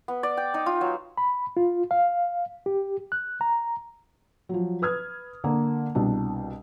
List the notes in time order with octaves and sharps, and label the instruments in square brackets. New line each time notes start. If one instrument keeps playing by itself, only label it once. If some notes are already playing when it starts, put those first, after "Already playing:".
[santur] B3
D5
G5
D#4
F4
F#3
[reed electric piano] B5
F4
F5
G4
F#6
A#5
[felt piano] F3 F#3
B4 D#6 F6 G#6
D3 A#3
C2 B2 D4